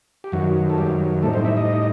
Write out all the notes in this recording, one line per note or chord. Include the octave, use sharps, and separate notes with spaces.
G4
F#2 D#3 F#3 F#4
A4
G3 G4
A2 G3 A3 C4 D#4 A4
C4 C5
E4 E5
D#4 D#5